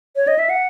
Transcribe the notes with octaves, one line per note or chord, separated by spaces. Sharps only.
C#5
D#5
E5
F#5